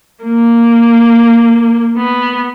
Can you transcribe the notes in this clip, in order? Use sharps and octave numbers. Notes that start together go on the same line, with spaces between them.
A#3
B3